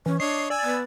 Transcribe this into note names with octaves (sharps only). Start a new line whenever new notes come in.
E3 C#4
D4 C#5 D#5 C7
D5 G#5 E6
B3